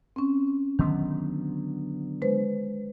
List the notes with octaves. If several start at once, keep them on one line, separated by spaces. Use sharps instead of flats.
C4 C#4
D3 D#3 F#3 B3
G#3 B4 C5